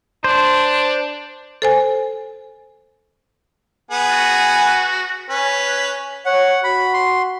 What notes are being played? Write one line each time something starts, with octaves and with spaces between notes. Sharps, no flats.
D4 C5
A4 C5 G#5
B3 G#4
F#4
C#4 B4
C#5 F#5
F#4 B5
C6